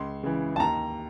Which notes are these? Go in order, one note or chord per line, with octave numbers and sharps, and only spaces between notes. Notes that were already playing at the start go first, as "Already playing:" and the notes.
Already playing: C#2 C6
C#3 E3
A5
D#2 A#5